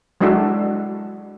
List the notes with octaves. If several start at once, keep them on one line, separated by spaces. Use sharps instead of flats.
F#3 G#3 D4 E4 F#4 A4